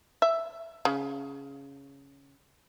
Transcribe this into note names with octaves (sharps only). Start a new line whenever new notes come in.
E5
C#3